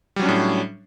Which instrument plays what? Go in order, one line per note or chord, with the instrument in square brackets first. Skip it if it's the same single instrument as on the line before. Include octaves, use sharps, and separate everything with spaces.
[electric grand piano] G3
F#3
C#4
D4
A2